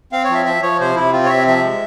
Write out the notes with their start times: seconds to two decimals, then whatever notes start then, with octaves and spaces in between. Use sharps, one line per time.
0.12 C4 F5
0.24 C#5
0.30 F3 E5
0.46 F3 E5
0.62 F3 C#5
0.80 C3 C5
0.96 C3 E4
1.13 C4 F4
1.26 C#5
1.30 C3 E5
1.47 F3 E5
1.64 G#3